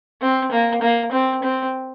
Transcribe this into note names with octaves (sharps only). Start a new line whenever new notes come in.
C4
A#3
A#3
C4
C4